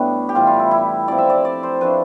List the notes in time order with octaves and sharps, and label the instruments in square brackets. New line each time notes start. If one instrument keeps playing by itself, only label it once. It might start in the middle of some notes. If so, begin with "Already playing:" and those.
Already playing: [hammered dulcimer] A2 G3 A3 B3 D4 B4
G4
A2 E3 G3 F4
F4
E4
E4
F3 C4 E4 D5
E5
D5
D5
C5
F3 A3 D4 B4